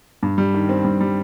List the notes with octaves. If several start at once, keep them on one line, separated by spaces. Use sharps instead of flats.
G2
G3
D#3
C4
G2
G3